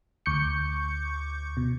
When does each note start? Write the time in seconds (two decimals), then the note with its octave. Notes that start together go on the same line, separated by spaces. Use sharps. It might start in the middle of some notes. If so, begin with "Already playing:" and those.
0.26 D2 C#6 D6 G6 C#7
1.57 B2